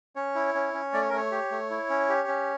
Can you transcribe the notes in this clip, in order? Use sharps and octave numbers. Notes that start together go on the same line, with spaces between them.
C#4 C#5
E4
C#4
C#4
A3 D5
C#5
A#4
A3 C#5
G4
A3
E4
C#4
G4
C#4